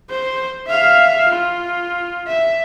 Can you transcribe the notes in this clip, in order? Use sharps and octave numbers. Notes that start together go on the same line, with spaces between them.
C5
E5 F5
F4
E5